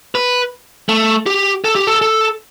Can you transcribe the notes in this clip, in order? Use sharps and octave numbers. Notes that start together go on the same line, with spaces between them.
B4
A3
G4
A4
G4
A4
A4